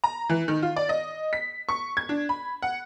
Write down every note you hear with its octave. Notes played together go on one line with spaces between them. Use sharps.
A#5
E3
D#3
F4
D5
D#5
B6
C#6
G#6
D4
B5
F#5